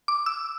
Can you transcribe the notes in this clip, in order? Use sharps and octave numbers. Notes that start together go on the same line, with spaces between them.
D6
E6